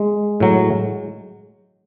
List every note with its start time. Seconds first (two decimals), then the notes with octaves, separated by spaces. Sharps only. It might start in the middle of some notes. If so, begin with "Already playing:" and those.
Already playing: G#3
0.40 A2 F#3